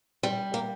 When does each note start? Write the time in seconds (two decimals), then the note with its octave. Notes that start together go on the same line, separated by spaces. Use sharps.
0.23 G3
0.54 A#3